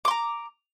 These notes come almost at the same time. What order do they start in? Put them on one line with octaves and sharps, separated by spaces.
D6 C6 A#5